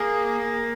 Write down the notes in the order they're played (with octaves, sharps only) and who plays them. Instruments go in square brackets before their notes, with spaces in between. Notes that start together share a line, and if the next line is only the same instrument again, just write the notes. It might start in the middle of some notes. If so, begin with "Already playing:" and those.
Already playing: [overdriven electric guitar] A#3 [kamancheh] G#4